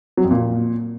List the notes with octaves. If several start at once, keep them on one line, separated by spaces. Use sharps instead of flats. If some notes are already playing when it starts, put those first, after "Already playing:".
F#3
F2
A#2